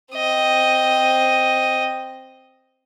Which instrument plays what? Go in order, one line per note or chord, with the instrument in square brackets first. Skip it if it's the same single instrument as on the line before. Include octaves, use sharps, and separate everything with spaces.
[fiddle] C4 D#5